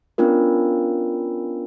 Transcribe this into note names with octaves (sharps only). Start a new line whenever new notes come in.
B3 C#4 D4 F4 A#4